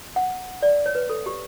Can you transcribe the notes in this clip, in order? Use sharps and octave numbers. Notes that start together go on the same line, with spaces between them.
F#5
D5
C#5
B4
A4
G4